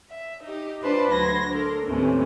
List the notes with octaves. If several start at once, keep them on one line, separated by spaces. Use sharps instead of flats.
E5
D#4 G4
D4 F4 B4 C5 D5 A5
D2 F#3 C6 G#6 A#6
D4 A4 A#4 C6
D#2 A2 C3 E3 A3 C#4